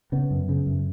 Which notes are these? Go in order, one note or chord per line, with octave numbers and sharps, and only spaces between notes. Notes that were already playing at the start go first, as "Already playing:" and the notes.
C#3 B3
F#2
C#3
F#2